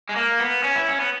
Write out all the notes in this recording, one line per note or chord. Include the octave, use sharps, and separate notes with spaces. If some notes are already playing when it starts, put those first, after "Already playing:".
G#3
A#3
B3
C#4
E4
C#4
B3